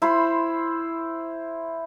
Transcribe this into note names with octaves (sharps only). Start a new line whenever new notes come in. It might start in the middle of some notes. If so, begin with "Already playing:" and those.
E4 C5 B5 C6